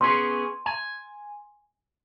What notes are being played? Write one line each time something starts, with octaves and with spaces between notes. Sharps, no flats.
B3 C#4 G#4 C6
G#5